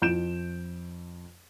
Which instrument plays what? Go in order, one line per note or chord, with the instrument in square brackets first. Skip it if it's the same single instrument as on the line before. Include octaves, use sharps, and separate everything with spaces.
[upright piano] F2 G6 D7 E7